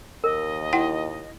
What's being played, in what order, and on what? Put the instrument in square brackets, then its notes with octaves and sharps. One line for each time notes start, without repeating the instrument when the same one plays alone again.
[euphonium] D#2 [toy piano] A#4 [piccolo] D#5
[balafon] E4 F#5 G5